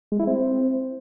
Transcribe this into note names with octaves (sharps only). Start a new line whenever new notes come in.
G#3
E4
C4